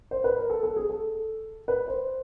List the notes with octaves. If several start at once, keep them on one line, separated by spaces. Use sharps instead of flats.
C5
B4
A#4
A4
A4
G#4
A4
B4
C5